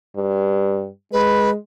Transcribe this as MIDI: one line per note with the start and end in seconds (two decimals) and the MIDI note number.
0.16 0.87 43
1.12 1.55 56
1.12 1.50 71